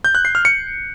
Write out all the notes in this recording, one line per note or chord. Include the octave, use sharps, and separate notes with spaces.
G6
F#6
C7
F6
C#7